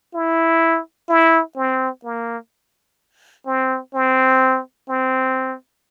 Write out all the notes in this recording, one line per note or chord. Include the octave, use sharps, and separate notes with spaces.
E4
E4
C4
A#3
C4
C4
C4